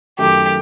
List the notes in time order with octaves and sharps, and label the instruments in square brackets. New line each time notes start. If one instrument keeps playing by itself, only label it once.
[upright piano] F#2 D#3 A3 [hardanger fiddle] G4